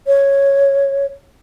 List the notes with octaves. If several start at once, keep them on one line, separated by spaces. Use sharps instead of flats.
C#5